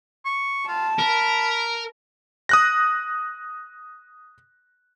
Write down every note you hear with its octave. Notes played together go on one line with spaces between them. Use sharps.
C#6
F4 A5
A#4 B5
D#6 F#6 A#6